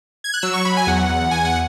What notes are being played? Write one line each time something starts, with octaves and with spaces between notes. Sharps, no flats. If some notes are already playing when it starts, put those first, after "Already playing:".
G#6
F#6
F#3 E6
C#6
F#3 B5
G#5
E2 F#5
E2
E2 G#5
F#5